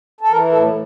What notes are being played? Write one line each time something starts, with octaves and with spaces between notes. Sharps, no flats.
A4
E3 A#4
A2 A4